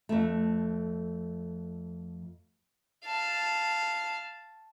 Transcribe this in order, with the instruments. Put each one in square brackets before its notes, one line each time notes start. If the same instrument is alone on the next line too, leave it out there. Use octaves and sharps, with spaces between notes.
[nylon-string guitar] F2 A3
[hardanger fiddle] F5 A5